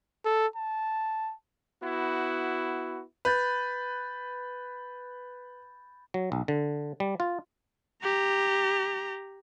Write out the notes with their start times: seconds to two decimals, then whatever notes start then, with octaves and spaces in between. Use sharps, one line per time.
0.25 A4
0.56 A5
1.83 B3 E4 F#4
3.25 B4 B5 G6 A6
6.14 F#3
6.32 B1
6.48 D3
7.00 G3
7.20 F4
8.03 G4 A#5